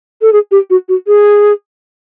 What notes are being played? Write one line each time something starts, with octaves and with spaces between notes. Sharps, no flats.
A4
G#4
G4
F#4
F#4
G#4